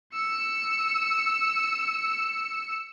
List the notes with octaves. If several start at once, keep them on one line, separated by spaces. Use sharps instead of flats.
E6 C#7